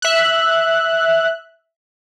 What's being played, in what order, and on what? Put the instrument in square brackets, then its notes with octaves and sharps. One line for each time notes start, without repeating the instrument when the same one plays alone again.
[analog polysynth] E5 F#6